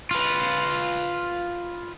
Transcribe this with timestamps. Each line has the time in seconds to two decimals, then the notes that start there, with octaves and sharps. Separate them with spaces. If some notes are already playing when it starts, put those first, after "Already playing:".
0.11 F4 B4